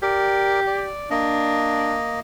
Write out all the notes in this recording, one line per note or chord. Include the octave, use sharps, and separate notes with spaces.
G4 A#4 D5
D5
A#3 D4 D#5